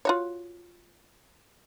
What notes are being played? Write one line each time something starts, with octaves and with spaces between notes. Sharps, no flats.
F4 F#4 C#5